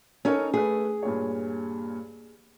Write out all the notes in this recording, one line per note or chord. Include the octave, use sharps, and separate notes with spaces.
C#4 D#4 A4 A#4 C#5
A3 G#4 B4
G2 A#2 C#5